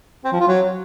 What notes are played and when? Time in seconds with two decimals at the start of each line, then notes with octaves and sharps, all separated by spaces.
0.25 C4
0.32 F3
0.40 F4
0.48 F#3